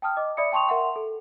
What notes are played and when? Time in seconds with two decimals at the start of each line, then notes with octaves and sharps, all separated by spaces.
0.02 G5 A5 D#6 F6
0.17 D#5 D6
0.37 D5 E5 B5 D#6 C#7
0.52 G5 A5 C6 C#6 D#6 F7
0.68 A#4 E5 F#5 C6
0.96 A4